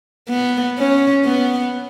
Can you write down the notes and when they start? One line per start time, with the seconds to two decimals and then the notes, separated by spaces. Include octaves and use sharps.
0.29 B3
0.78 C#4
1.25 B3